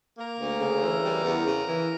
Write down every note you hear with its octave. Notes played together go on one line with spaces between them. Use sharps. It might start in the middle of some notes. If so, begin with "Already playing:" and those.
A#3 A#4
D2
C#3
E3
G3
E2
C#3
E3